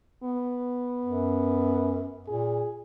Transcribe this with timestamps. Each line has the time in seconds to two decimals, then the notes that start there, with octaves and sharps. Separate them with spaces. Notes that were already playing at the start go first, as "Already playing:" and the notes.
0.24 B3
1.05 F#2
2.28 A#2 G#4